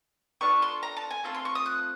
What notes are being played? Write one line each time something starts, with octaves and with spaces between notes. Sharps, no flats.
B3 D4 F4 A4 C#6
C6
A#5
A5
G#5
A3 C4 F4 A5
C6
C#6
D#6
F#6